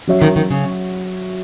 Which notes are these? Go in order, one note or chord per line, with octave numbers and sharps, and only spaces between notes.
F#3 C#4 F#4 C#5 E5
D#3
D#3
C#3